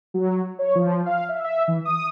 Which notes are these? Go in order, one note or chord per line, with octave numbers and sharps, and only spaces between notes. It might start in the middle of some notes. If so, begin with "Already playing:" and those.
F#3
C#5
F3
F5
E5
E5
E3
D#6